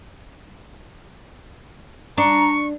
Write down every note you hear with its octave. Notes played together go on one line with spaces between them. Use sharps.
D4 A#5 C#6